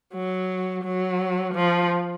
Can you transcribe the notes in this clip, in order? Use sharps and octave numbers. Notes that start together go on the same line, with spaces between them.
F#3
F#3
F3